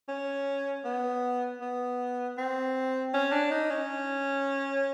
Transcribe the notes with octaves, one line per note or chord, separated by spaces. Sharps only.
C#4
B3
B3
C4
C#4
D4
D#4
C#4